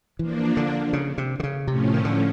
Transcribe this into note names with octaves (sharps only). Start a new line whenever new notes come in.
E3 F3 A#3 D4
D3
C#3
C3
D3
C#3
A2 C3 F3 A3 C#4
D#3
D3